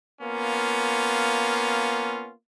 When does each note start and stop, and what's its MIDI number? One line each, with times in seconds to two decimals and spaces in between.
0.21 2.31 58
0.21 2.31 59
0.21 2.31 61
0.21 2.31 65